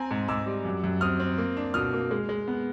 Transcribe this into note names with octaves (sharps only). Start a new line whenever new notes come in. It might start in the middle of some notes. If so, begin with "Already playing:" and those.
Already playing: C4 G#5 A#5
G#2
G#2 D6 E6
G3
F#2
F#2
C4 D#6 F6
C4
A#3
D4
B2 D#6 F6
A#3
G#3
G#3
B3